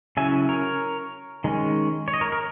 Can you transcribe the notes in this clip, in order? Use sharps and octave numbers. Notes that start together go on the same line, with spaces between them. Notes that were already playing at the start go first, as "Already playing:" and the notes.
C#3 F#3 C#4 E4 E5 G#5
A#4 C#5
D#3 G#3 C#4
C#5
D#5
A#4 C#5
A#4